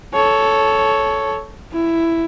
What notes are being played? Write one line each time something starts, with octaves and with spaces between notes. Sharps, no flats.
A4 C#5
E4